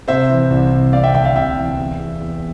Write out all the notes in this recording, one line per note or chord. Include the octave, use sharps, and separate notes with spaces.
C3 C5 E5
E3
C2
C3
C3 D5 F5
E5 G5
D2 E5 G5
D5 F5
C3 E5 G5
E3
E2
E2
E2